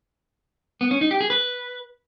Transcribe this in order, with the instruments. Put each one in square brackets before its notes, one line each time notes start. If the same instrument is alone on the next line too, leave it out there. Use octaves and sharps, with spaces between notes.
[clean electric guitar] B3
C#4
D#4
G4
G#4
B4